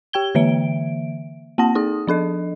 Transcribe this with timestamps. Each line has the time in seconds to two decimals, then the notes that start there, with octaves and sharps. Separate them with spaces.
0.13 G4 G5 G#6 G7
0.35 D3 E3 A#3 E5 D7
1.58 A#3 C4 F#5 A5 A#6
1.75 D#4 G#4 D#6
2.07 F3 D4 A4 D#5